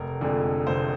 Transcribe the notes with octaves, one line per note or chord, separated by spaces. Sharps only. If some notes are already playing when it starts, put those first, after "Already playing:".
Already playing: F1 A#4
F2 D3 G#3
F1 C5